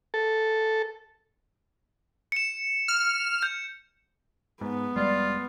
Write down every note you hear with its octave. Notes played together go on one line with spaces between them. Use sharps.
A4
C#7 E7
F6
G6
G#2 B3
F1 G3 G#3 F4 D5